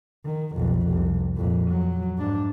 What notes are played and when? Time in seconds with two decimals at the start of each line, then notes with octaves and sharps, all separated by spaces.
0.25 D#3
0.56 B1 F2
0.89 C2
1.36 F2 A#2
1.70 F#3
2.17 G#2 D4